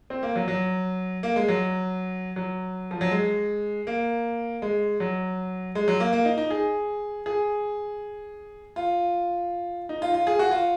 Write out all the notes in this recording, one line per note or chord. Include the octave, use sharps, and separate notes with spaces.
C4
A#3
F#3
F#3
A#3
G#3
F#3
F#3
F3
F#3
G#3
A#3
G#3
F#3
G#3
F#3
A#3
A#3
D#4
D#4
G#4
G#4
F4
D#4
F4
F4
G#4
F#4
F4